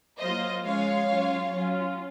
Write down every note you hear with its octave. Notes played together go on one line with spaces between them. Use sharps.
F#3 A#3 F4 C5 D#5
F3 G#3 C#4 F4 C#5 F5
F#3 C#4 F4
F#3 C#4 F4